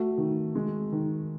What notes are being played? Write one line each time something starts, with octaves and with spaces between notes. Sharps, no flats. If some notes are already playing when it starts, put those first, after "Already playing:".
Already playing: A3 F#4
D#3
G#3
D#3